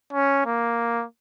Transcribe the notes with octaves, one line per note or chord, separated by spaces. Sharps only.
C#4
A#3